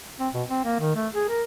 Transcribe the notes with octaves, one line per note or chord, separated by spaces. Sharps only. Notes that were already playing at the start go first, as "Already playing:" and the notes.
C4
B2
C4
A#3
D#3
A3
G#4
A#4